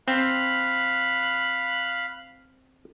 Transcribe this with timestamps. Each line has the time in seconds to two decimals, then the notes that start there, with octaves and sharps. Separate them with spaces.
0.08 C4 F5 B5 F#6